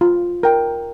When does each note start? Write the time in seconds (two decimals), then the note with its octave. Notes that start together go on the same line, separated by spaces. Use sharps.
0.01 F4
0.43 A#4 G5